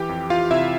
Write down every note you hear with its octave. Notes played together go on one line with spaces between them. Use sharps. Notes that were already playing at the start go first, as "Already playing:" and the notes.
Already playing: E3 G4 G5
F2
E3 F4 F5
C3 E4 E5